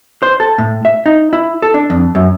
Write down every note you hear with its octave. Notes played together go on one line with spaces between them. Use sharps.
C5
A4
A2
E5
D#4
E4
A4
D4
F2
F#2